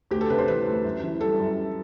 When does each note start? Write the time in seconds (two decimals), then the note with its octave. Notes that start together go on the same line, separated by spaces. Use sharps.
0.11 D2 G4
0.21 A4
0.30 C3 B4
0.38 C5
0.48 E3 B4
0.67 D2
0.85 F#2
1.03 E3
1.21 G3 A4
1.40 F#2